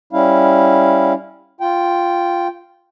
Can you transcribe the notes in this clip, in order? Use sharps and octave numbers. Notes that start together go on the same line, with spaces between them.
G3 C#4 E4 F5
F4 G5